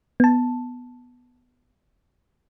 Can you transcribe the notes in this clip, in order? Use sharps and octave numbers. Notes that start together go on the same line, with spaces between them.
B3 A5